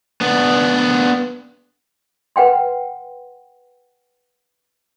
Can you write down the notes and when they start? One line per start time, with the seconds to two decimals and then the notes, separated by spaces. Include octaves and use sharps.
0.21 B3 D4
2.36 B4 F#5 G5 C6